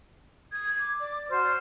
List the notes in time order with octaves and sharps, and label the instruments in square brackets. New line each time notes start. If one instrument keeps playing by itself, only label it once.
[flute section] D#6 [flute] G#6
[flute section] D6
[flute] D5
[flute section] F#4 C5 F6
[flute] D5